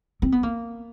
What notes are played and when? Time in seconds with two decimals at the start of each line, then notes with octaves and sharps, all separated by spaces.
0.22 C4
0.32 B3
0.43 A#3